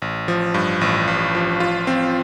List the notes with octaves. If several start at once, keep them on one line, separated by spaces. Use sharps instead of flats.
A1
F3
G2
A1
A1
F3
F4
C4